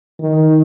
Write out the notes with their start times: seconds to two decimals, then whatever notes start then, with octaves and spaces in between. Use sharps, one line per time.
0.20 D#3